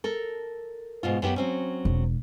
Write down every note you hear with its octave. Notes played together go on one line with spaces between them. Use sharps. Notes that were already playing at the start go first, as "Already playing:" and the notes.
A4 A#4
G#2 B2 F4
F#2 B3 G4
F#3 C4 C#4
E1